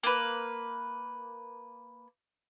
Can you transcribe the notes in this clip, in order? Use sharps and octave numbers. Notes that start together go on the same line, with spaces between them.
A#3 B4